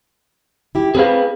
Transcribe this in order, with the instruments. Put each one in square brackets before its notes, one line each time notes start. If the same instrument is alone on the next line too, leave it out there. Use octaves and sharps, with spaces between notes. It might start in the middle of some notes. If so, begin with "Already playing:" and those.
[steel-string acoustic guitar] E4 G4
[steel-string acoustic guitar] C4 [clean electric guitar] G#4 B4 F5